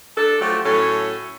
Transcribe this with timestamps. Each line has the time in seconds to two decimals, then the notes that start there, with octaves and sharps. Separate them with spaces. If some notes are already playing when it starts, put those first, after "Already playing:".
0.17 D4 A4
0.40 F3 F#3 A3 F#4 G4
0.65 A2 F#3 C#4 A4